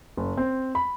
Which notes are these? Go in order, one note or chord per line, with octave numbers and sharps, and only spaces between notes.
F#1
C4
B5